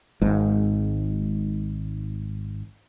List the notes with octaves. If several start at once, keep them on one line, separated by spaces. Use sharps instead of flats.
G#1 G#2